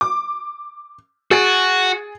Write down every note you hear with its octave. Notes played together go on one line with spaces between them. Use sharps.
D6
F#4 G#4 A6 D7